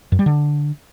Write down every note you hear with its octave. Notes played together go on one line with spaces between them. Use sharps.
F#2
G3
D3